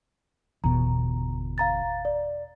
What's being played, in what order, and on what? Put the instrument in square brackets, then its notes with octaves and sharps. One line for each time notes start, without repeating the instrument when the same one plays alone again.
[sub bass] G1 [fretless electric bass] E2 B2 [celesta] A#5
[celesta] F5 A#5 A6
D5